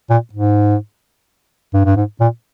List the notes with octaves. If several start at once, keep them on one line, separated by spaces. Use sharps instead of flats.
A#2
G#2
G2
G2
G#2
A#2